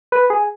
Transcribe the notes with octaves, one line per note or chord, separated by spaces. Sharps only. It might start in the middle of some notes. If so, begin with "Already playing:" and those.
B4
G#4